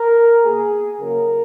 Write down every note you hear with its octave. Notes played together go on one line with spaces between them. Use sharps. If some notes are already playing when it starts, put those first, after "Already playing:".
Already playing: A#4
B2 A#3 G#4
C#3 F#3 A#3 A#4